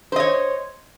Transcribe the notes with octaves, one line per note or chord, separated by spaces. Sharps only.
C5 C#5 D#5